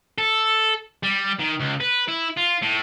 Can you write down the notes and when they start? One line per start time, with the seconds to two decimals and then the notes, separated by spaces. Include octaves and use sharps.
0.18 A4
1.03 G3
1.40 D#3
1.60 C#2
1.80 B4
2.08 E4
2.37 F4
2.62 A2